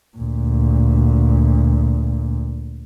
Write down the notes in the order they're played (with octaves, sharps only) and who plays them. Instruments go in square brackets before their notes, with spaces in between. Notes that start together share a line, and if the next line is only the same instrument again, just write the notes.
[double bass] D2 A#2